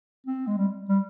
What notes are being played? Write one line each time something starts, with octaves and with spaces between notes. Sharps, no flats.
C4
G#3
G3
G3